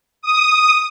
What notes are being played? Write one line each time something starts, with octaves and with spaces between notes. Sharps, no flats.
D#6